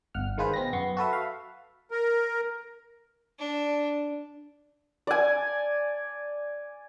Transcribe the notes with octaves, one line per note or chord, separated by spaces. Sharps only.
G1 F#5 F6
D#3 G#3 F4 G#4 B4 C5
B2 C4 A#6
F#2 B3 C6 C#6
F#4 A4 B4 E5
F5
A#4
D4
D5 G#5